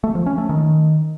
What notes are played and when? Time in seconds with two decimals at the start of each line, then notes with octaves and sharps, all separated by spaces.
0.04 A3
0.15 F3
0.26 C#4
0.38 A3
0.49 D#3